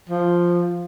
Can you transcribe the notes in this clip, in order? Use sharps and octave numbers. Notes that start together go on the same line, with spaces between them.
F3